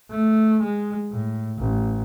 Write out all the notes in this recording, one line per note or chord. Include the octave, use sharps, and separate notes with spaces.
A3
G#3
A2
A1